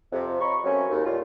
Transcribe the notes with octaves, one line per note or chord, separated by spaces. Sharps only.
F2 C3
C#5 D#5 A#5 B5 C#6
F#3 A3 A#3 C4 C#4
D#2
A2 G3 G#3 F4